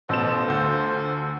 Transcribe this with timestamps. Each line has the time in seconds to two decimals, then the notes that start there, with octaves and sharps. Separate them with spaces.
0.09 A1 B2 F4 A4 C5 E7
0.48 D2 G6